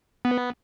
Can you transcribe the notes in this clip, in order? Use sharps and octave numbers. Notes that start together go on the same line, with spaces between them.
B3